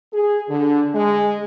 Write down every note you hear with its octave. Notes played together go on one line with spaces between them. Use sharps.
G#4
D3
G#3